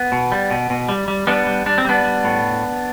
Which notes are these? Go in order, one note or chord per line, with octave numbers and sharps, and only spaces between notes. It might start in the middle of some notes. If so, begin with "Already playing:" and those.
Already playing: B3
B2
G3
B2
B2
G3
G3
G3 B3 D4
G3
G3 D4
C4
G3 B3 D4
G3
A2